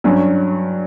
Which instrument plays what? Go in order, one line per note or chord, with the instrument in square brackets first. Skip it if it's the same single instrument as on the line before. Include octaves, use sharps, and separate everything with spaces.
[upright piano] G2 F#3 C#4